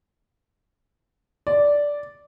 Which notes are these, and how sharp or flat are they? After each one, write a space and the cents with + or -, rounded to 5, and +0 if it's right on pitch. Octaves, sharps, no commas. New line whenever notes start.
D5 -10